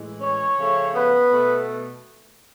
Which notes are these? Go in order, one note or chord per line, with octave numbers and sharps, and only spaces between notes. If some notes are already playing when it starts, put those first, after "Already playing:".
Already playing: A2 E3 G#3
C#4 C#5
C#3 F3 A3
B3 B4
B2 A3